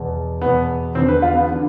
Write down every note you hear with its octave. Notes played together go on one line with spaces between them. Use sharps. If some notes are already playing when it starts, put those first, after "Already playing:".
Already playing: E2 B2
E2 B2 B3
E2 D3 C4
B4
F4
B3
D3